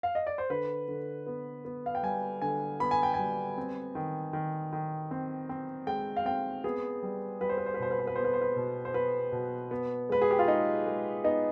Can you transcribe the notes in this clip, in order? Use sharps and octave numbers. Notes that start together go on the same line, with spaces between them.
F5
D#5
D5
C5
D3 B4
D3
B3
B3
F5
G5
G3 G#5
D3 G#5
B3 B5
G#5
G5
G3 G#5
C4
D#3
D#3
D#3
C4
C4
G#3 G5
F5
C4 G5
B3 G#4
G3
G3 B4
C5
B4
C5
B4
B2 C5
B4
C5
B4
B3 C5
B4
C5
B4
B2
C5
B3 B4
B2
B3
G#3 B4
G#4
G4
F4
G#3 D#4
G#3
B3 D#4